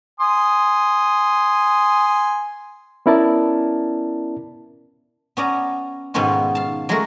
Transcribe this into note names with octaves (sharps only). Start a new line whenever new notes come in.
G#5 C6 D#6
B3 C#4 E4 A#4 D5 A5
B3 C#4 D5 A#5
G#2 B2 D#3 B3 C#4 F4
F5 A5
F#3 G#3 A3 F#4 A#4